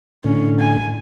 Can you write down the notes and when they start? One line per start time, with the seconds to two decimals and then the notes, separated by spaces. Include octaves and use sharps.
0.24 A2 D3 C#4
0.60 G#5